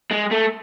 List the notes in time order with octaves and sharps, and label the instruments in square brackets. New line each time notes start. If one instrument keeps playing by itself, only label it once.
[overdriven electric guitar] G#3
A3